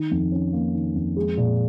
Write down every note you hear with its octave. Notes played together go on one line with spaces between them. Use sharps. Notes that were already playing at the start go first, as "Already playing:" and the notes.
Already playing: D#3
F2
C#4
A#3
D#3
F2
G#3
A#2